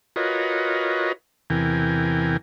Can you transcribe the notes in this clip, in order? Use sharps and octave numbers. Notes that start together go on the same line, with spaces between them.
F4 F#4 A#4 B4 C#5 D#5
E2 C3 E3 A#4 G5 G#5